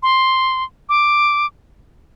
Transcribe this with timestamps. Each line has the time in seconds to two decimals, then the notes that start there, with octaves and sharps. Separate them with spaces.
0.03 C6
0.89 D6